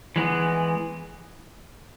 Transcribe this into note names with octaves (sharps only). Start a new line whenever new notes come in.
E3 G#3 B3